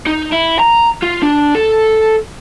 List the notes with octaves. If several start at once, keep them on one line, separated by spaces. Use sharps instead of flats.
D#4
E4
A#5
F4
D4
A4